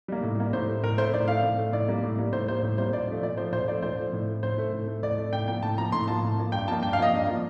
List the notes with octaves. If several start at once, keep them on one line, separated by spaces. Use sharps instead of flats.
G3 A#3
A2
G3 A#3
A2 C5
A3
A2 A#4
A3 C5
A2 D5
A3 F5
A2
A3
A2 D5
G3 A#3
A2
G3 A#3
A2 C5
G3 A#3 C5
A2
G3 A#3 C5
A#2 D5
F3 A3
A#2 D5
F3 A3 C5
A#2 C5
F3 A3 D5
A#2 C5
F3 A3
A2
A3
A2 C5
A3
A2
A3
A2 D5
A3
A2 G5
F3 A#3 G5
A2 A5
F3 A#3 A#5
A2 C6
F3 A#3 A5
A2
F3 A#3
G2 G5
F3 A#3 A5
G2 G5
F5
F3 A#3 D#5
G2
F3 A#3